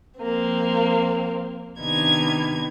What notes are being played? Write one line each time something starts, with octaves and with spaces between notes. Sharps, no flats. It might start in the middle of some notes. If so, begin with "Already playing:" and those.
F3 A#3 C4
C3 D#3 B3 D4 D#4 G#6